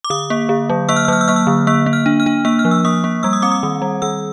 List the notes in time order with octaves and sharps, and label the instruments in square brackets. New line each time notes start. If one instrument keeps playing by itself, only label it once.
[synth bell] D6
D3 D#6
A#3
D3
F#3
A#3 E6
F6
E6
F#3 F6
E6
A#3 F6
E6
D3
A#3 E6
A#3
F6
D4
F6
D4
A#3 E6
F6
F3
E6
A#3 D#6
A#3
G3 E6
D#6
C4 D6
D#6
D#3
G3
D#3 E6